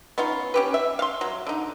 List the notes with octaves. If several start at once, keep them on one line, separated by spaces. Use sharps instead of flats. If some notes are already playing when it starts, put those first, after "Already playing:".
B3 C#4 D#4 F4
C#4 G4 B4
E5
F5 C6
F#3
D3 D#4